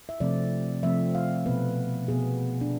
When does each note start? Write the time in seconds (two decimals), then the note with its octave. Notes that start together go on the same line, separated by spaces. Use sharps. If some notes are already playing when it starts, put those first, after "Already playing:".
0.09 E5
0.20 C3 F3 A3 C4 D5
0.83 C3 F3 A3 C4 E5
1.15 F5
1.46 B2 B3 B4
2.08 B2 B3 G#4
2.61 D4